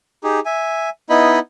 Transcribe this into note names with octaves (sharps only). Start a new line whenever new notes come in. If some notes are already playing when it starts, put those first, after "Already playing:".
D#4 G4 G#4
E5 G#5
B3 D#4 E4 D#5 B5